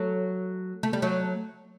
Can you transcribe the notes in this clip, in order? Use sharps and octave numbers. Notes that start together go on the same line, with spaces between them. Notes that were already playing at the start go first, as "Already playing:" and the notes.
Already playing: F#3 A3
A3
G3
F#3 A3